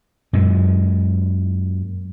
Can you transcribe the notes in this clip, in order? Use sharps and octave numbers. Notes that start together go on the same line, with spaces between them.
F#2 A#2 G#3